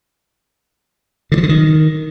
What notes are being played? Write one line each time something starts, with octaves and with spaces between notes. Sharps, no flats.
D3
F3
D3
D#3